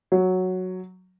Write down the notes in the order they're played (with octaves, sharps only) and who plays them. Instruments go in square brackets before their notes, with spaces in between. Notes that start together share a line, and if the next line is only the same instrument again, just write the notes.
[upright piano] F#3